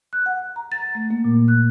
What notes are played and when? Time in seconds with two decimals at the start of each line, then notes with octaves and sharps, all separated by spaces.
0.13 F#6
0.26 F#5
0.56 A#5
0.72 A6
0.95 A3
1.11 A#3
1.25 A#2
1.48 F#6